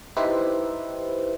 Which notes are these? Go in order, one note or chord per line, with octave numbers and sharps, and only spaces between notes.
D#4 E4 G4 B4 C5 E5